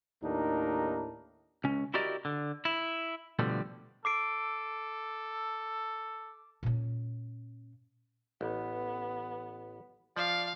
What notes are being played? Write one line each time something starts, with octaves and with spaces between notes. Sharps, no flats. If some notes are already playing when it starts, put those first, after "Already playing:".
D#2 A2 D4 D#4 A4 A#4
C#2 C#4
E4 F#4 G4 A#4 D5 D#5
D3
E4
B2 D3 F3 G3 A3
A4 D6 C7 D7
A#2 C#4
A1 B3
F3 D5 F5